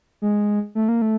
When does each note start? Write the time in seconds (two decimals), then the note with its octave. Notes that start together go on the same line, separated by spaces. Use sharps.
0.22 G#3
0.75 A3
0.89 A#3
1.02 A3